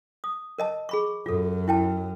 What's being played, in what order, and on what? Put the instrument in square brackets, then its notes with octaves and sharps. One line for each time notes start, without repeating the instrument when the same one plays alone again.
[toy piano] D#6
A#4 D#5 A5
G#4 B5 C#6
[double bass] F#2 [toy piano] F4 A4
[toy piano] E4 G5 A5